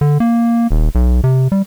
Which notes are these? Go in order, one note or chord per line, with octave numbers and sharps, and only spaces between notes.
D3
A#3
D#1
B1
C3
G3